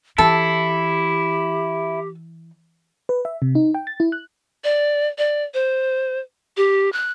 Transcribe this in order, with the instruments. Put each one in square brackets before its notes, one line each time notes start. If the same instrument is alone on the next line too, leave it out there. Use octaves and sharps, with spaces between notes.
[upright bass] E3 [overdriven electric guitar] E4 [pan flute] G4 [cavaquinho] A4
[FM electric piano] B4
E5
C3
D#4
G5
A6
E4
F#6
[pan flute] D5
D5
C5
G4
F#6